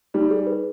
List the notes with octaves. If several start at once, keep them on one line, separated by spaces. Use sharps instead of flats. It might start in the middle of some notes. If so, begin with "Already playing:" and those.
G3 D#4
G#4
B4